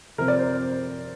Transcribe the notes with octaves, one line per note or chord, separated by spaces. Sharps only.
C3 F3 C4 A#4
D5
C5